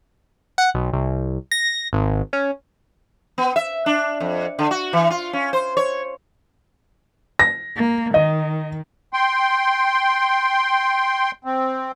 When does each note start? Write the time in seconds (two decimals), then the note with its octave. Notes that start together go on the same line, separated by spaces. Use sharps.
0.58 F#5
0.74 B1
0.93 C2
1.52 A#6
1.93 G#1
2.33 C#4
3.38 B3
3.56 E5
3.86 D4
4.20 F2
4.59 D3
4.71 F#4
4.93 E3
5.10 F4
5.33 C#4
5.53 C5
5.77 C#5
7.39 A#6
7.76 A#3
8.14 D#3 D#5
9.13 G5 C6
11.44 C4